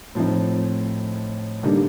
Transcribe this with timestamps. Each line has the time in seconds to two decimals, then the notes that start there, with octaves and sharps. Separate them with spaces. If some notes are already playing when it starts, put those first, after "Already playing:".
0.15 A2 F3 C4 D#4
1.63 D3 G3 A#3 D#4